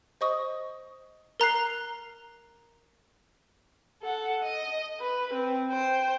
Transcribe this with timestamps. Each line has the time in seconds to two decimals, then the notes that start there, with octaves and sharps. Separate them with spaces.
0.21 C5 D#5 C#6 D#6
1.40 A#4 A#5 F#6 C7
4.03 A4 F#5
4.43 D#5
5.00 B4
5.33 C4
5.70 C5 G5